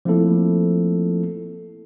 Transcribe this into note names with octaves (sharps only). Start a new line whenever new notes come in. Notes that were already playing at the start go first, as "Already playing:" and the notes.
F3 A3 A#3 C4 E4 A4